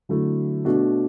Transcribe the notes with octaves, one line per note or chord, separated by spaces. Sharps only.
D3 F#3 A3 E4
B2 A3 D4 F#4